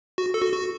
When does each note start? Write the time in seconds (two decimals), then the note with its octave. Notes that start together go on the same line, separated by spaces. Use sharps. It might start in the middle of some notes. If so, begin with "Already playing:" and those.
0.18 F#4
0.34 A4
0.42 F#4
0.53 F#4